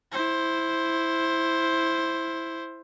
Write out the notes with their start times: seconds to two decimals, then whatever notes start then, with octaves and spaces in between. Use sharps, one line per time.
0.12 E4 C5